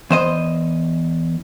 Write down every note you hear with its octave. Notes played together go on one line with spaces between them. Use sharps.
E2 C5 D#5